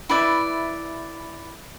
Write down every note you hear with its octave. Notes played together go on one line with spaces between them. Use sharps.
E4 B4 D5 E5